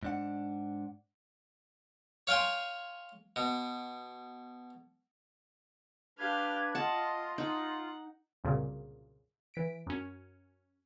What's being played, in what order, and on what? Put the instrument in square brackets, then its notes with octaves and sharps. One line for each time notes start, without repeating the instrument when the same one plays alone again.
[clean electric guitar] G#2 D4 F#5
[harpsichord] C#5 F5 G5 G#5 C6
B2
[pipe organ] D4 B4 G#6 [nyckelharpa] G4 F5
[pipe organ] F4 [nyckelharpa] D#5 [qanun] F#5 A5
[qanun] D#4 [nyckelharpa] F#5
[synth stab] C2 F#2 A#2 C#3
E3 B6 D7
F#2 C#4